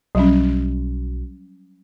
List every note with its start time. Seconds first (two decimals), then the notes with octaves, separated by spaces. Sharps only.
0.15 B1 F#3 G3 C#4